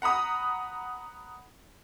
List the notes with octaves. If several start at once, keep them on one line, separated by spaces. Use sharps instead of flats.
F#5 A#5 B5 D#6